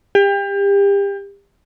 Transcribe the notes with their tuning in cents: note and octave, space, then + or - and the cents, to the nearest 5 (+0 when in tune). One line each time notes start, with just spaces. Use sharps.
G4 +30